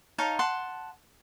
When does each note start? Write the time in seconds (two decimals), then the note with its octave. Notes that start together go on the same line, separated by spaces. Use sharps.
0.18 D#4 C#5 F5 A5
0.39 F#5 A5 C6